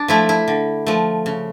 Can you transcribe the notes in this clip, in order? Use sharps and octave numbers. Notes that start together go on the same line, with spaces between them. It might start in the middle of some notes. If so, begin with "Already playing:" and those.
Already playing: D4
F3 A3 E4
E4
D3
F3 A3
C#3